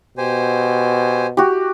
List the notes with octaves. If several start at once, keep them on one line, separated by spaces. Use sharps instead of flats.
B2 G4 C5 G#5
F#4 G4